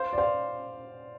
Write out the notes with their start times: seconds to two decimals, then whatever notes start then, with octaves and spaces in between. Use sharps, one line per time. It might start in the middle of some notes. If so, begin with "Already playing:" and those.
Already playing: C5 F5
0.13 D5
0.18 C5 F5